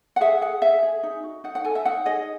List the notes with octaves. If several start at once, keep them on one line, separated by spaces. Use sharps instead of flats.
F#5
G#4 E5
G#4 F#5
G#4 E5
G#4
D#4
F#4
D#4 F#5
F#5
A4 G#5
E5
D#4 F#5
G#4 D#5